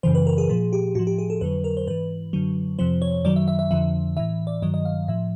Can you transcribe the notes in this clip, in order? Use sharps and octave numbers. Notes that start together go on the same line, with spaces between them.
F#2 C#3 E3 C5
B4
A#4
G#4
A#2 F3 G#4
G4
A2 F3 F#4
G4
G#4
A4
F2 D3 F#3 B4
A#4
C5
G#2 E3 B4
F#2 D3 F#3
F2 C3 F3 C5
C#5
F#2 D#3 F#3 D5
E5
E5
E5
F2 D3 F3 E5
A2 E3 E5
D5
G2 D#3 F#3 D#5
D#5
F5
A2 F3 E5